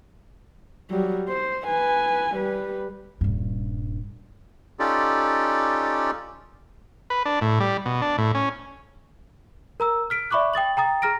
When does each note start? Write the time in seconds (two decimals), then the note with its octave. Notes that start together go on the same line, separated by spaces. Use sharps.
0.90 F#3 G3
1.28 C5
1.65 B4 G#5
2.35 G3 B4
3.21 D#1 G2
4.79 C#4 D#4 F4 G4 A4 D5
7.10 B4
7.26 D4
7.41 A2
7.60 G3
7.86 B2
8.02 D4
8.18 A2
8.35 C#4
9.80 A#4 A#5 E6
10.10 F6 B6 D7
10.31 D5 E5 B5 C#6 D6 F#6
10.53 G5 D#6 A6 F#7
10.77 G5 A#5 D#6 A6
11.02 G#4 A#5 F6 A#6 D7